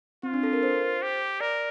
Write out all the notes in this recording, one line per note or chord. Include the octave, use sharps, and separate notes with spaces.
C4 F4
D4
A4
A#4
C5
G4
A#4 D5